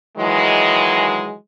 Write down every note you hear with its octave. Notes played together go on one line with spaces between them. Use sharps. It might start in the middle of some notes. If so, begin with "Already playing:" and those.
D#3 E3 F#3 G#3